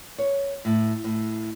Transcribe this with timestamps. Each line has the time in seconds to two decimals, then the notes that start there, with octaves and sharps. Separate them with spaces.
0.18 C#5
0.65 A2
1.04 A2